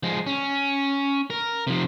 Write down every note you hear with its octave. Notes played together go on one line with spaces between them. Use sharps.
F3 G#3
C#4
A#4
C3 F3